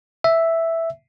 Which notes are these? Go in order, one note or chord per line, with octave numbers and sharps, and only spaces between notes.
E5